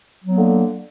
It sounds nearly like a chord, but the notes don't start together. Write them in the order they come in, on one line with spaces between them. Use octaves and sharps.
F#3 B3 A#3 D3